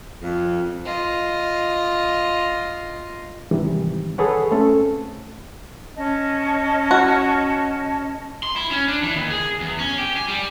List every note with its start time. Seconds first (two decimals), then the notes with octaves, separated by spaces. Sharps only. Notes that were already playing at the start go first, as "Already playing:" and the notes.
0.22 F2
0.85 F4 D#5
3.51 G#2 C3 D#3 E3 G3
4.18 G#4 A4 B4 C#5 F#5
4.51 A3 C4 C#4 A4
5.95 C#4 D#5 A5
6.91 F#4
8.43 C6
8.56 E4
8.71 C#4
8.88 D4
9.03 E3
9.16 D#2
9.30 G#4
9.60 E2
9.79 C#4
9.98 G4
10.17 G#5
10.28 G3